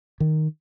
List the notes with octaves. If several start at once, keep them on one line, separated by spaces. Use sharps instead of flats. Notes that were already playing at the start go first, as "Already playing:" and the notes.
D#3